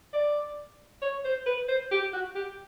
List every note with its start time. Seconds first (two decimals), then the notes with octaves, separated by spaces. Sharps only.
0.13 D5
1.01 C#5
1.24 C5
1.46 B4
1.68 C5
1.91 G4
2.13 F#4
2.35 G4